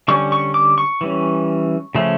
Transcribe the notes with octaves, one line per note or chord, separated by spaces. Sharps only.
D3 G3 C#4 C#6
C#6
D6
C#6
E3 G3 C#4
C#3 F3 A3 C#4